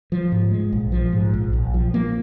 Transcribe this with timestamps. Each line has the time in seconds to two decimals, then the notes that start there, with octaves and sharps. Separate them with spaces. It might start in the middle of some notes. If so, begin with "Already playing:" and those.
0.12 F3
0.32 G#2
0.51 G#3
0.72 A#1
0.92 F3
1.13 G#2
1.34 A#1
1.53 A#1
1.74 F3
1.94 A#3